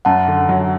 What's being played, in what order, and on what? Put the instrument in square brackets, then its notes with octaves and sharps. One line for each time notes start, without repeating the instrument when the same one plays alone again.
[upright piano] F#2 [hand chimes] F#5 A5
[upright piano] D3
F#3